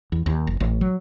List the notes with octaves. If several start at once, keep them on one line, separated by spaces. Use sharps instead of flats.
E2
D#2
F#1
A1
F#3